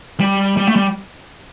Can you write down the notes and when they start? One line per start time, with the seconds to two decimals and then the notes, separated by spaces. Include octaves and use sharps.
0.20 G3
0.57 G3
0.67 A3
0.76 G3